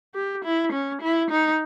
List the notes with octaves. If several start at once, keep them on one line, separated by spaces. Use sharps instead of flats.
G4
E4
C#4
E4
D#4